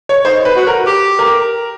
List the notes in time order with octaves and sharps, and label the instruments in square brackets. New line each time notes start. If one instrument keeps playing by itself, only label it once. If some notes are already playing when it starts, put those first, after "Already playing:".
[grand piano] C#5
[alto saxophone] D#4 [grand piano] C5
[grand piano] B4
[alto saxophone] F#4
[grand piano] A#4
[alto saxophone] G4
[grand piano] A#4